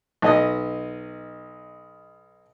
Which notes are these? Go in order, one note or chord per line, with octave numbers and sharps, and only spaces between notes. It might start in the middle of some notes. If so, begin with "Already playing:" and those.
B1 D#5 D#6